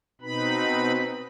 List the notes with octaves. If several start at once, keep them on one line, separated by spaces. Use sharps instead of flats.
B2 C4 D#4 B4 B5